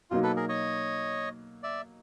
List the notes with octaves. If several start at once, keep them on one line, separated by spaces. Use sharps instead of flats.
B2 F#3 A#3 D#4 F4
A4 B4
G#4 A#4
C#5 D#5
D5 E5